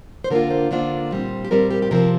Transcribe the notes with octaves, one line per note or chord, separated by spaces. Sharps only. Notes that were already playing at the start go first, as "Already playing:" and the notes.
C5
D3 A#3 D4 F4 A#4
C5
D3 A#3 D4 F4 C5
A#2 G3 C4
G4
A#2 G3 C4 A#4
G4
G4
C3 F3 C4 A#4